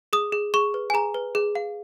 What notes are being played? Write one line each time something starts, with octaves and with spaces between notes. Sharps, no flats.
G#4 D#6
G#4
G#4 C#6
B4
G#5
G#4 A#5
B4
G#4
F5